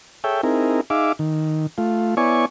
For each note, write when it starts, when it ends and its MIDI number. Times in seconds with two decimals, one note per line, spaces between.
0.24 0.41 68
0.24 0.41 69
0.24 0.41 73
0.24 0.41 76
0.24 0.41 79
0.43 0.81 60
0.43 0.81 63
0.43 0.81 64
0.43 0.81 68
0.43 0.81 70
0.90 1.12 63
0.90 1.12 68
0.90 1.12 76
0.90 1.12 77
0.90 1.12 86
1.19 1.67 51
1.78 2.15 57
1.78 2.15 65
2.17 2.46 59
2.17 2.46 64
2.17 2.46 73
2.17 2.46 74
2.17 2.46 80
2.17 2.46 85